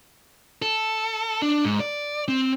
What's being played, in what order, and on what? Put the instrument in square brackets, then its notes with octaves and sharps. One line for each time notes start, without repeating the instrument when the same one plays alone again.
[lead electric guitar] A4
D4
G#2
D5
C4